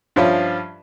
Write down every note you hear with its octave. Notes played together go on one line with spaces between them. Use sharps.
G2 F3 C#4 F4 E5